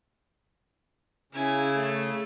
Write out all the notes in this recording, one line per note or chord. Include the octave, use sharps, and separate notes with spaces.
C#3 E4 G#5
A3